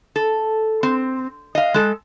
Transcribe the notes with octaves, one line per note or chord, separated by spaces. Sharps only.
A4
C4
D#5 F5
G#3 A4